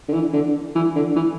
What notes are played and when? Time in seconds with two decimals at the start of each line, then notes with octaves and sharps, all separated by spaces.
0.08 D3
0.13 E3
0.33 D3
0.75 E3
0.95 D3
1.16 E3